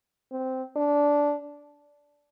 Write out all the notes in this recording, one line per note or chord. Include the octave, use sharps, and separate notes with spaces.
C4
D4